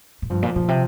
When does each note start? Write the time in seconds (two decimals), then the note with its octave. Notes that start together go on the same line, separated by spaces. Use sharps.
0.22 A#2
0.30 G2 F3
0.42 A#2
0.56 A#2 F3
0.68 C3